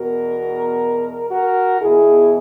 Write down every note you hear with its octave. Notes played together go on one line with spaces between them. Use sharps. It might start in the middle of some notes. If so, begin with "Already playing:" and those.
Already playing: E2 B2 F#4 A#4
F#4 A#4
E2 B2 E4 G#4